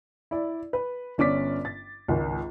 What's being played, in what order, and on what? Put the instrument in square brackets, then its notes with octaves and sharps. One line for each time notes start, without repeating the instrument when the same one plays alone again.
[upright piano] E4 D5
B4
G1 C#4 D5 D6 B6
A6
G#1 C#2